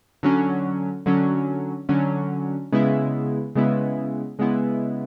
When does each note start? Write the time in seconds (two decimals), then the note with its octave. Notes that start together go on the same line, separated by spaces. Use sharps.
0.23 D3 F#3 C#4
1.06 D3 F#3 C#4
1.89 D3 F#3 C#4
2.72 C#3 G#3 B3 E4
3.55 C#3 G#3 B3 E4
4.39 C#3 G#3 B3 E4